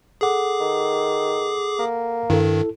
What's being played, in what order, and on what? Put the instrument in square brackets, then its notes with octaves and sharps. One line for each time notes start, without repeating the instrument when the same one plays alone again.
[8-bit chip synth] G#4 D6 [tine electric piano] A4 F#5
[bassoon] D#3
A#3
[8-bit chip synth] G2 D#3 [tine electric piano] E4 A4